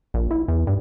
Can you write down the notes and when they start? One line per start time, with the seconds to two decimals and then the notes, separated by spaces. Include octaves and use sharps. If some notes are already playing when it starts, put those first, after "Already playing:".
0.14 A#1
0.31 E4
0.48 E2
0.67 G2